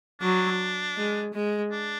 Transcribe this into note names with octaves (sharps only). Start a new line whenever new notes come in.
F#3 D4
G#3
G#3
D4